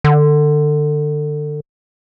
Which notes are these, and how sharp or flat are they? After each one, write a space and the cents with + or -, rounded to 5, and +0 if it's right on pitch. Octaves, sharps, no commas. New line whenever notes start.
D3 +25